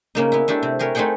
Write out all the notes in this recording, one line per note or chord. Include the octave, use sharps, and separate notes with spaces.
C#3 A#3 D#4
B3 E4
A3 D4 E4 G4
C3
G4 G#4 A#4 B4 C#5
A3 C4 D#4 G#4 F#5 G5